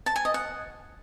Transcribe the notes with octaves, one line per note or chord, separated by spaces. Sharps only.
A5
G#5
D#5
F#5